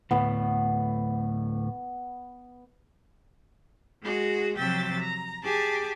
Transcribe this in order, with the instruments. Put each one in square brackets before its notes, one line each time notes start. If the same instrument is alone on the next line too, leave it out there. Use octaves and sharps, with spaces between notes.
[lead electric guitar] D2 A2 [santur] B3 B5
[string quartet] G#3 F#4 G#4
C3 F3 F#3 E5 G5 A6
A#5
G4 G#4 G#5 A5 D6